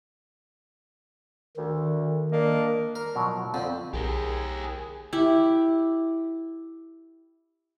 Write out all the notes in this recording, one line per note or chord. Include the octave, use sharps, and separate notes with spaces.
D2 D#3
A#3 D4 D#5
A#4
B2 F3 F#3
F2 D3 C4
B1 G4 G#4 A#4
E4 G4